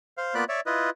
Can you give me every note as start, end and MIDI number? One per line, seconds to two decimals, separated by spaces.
0.18 0.34 72
0.18 0.34 77
0.35 0.44 58
0.35 0.44 59
0.35 0.44 65
0.35 0.44 74
0.35 0.44 83
0.35 0.44 90
0.49 0.60 73
0.49 0.60 74
0.49 0.60 76
0.66 0.90 64
0.66 0.90 65
0.66 0.90 71
0.66 0.90 75